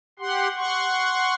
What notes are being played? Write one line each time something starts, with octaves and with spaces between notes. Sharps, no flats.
G4 F#5 C6
F#5 C6 C#6